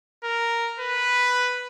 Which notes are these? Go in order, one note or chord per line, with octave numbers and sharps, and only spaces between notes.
A#4
B4